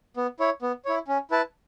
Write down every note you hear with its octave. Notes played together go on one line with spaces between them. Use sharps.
B3
E4 C#5
B3
E4 C#5
C#4
E4 B4 A5